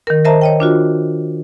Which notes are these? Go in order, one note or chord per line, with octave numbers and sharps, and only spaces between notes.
D#3 A#4
A#4 C5 D#5 E5 A5 A#5
C#5 D#5 G5
D4 F4 F#4